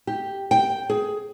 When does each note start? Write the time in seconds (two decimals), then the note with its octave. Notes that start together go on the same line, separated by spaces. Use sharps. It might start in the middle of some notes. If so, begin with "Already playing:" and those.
0.07 G4
0.51 G5
0.90 G#4